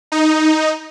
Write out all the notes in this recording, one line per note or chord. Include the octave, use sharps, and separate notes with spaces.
D#4